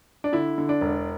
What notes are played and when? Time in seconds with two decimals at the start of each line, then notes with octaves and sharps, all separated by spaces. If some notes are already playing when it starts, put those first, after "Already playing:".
0.24 D4
0.33 D3 E4
0.58 D3
0.69 D4
0.81 E1